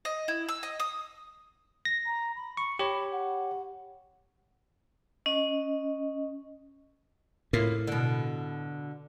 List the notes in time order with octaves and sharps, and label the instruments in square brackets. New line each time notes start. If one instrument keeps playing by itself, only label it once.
[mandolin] D#5
E4
E6
D#5
D#6
[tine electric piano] A#6
[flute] A#5
B5
[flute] B5 [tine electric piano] C#6
[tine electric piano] G4 C#5 [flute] B5
[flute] F#5
[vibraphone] C#4 D#5
[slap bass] A2 [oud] A#3 E4 F4
[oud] B2 D3